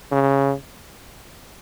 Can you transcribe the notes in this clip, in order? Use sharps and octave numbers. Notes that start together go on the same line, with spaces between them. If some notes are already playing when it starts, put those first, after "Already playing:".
C#3